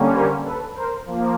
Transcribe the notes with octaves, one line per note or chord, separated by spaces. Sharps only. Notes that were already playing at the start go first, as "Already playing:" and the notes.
Already playing: D3 G3 A#3 C#4
A#4 C5
A4 B4
A#4 C5
F3 A#3